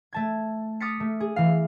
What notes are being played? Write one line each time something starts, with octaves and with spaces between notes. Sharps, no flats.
A3 A5 G#6
D6 D#6 F6 A6 B6 C#7
A3
G#4
E3 F5